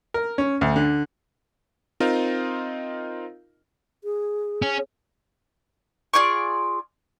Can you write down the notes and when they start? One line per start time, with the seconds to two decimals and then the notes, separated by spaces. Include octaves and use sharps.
0.14 A#4
0.38 C#4
0.61 D2
0.76 D3
2.00 C4 D#4 F4 A#4 D#5 F5
4.04 G#4
4.62 C#4
6.14 F4 G#4 D5 C#6